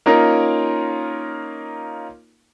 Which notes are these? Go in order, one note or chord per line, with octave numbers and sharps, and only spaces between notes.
A#3 C#4 D#4 F4 A#4